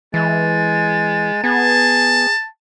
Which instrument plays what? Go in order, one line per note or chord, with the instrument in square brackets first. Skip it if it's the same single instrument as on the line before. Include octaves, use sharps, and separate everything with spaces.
[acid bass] E3 [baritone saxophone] G#3 [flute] A6
[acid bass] B3 [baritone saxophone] G#4 [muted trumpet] A5